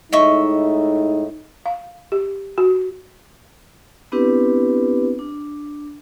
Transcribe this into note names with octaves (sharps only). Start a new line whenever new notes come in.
A2 G#3 D#4 D#5 E5 C#6
F5
G4
F#4
B3 C4 D4 E4 G4 B4
D4